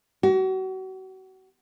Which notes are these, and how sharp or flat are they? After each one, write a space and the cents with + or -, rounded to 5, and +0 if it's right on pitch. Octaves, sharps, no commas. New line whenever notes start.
F#4 +35